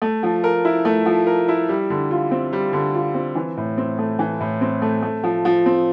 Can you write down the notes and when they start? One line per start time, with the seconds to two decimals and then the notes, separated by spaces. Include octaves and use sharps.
0.02 A3
0.23 F3
0.44 A#4
0.65 E4
0.85 A3
1.06 F3
1.27 A#4
1.48 E4
1.69 G3
1.90 D3
2.11 F4
2.31 C4
2.53 G3
2.73 D3
2.94 F4
3.14 C4
3.35 E3
3.57 A2
3.78 C4
3.99 A3
4.19 E3
4.40 A2
4.61 C4
4.82 A3
5.02 A3
5.24 F3
5.45 F3
5.66 C4